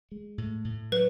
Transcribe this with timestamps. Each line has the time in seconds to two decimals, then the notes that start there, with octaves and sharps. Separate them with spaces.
0.12 G#3
0.38 A2
0.65 A2
0.92 F#3 B4